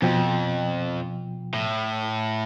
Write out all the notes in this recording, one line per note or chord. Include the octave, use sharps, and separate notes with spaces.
F2 B2 F3 G5
A2